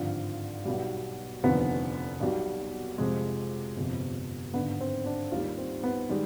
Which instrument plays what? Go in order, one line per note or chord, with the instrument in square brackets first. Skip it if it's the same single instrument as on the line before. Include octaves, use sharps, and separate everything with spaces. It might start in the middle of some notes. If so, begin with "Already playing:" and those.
Already playing: [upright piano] G#1 G2 D3 F3 F4
B1 B2 G3
F1 D#2 D3 F3 B3
B1 B2 G3
F2 C3 F3 G#3
G1 F2 C3
G#1 G2 D3 B3
C4
D4
D#2 D#3 G3 F4
C4
B3
D#3 G3 G#3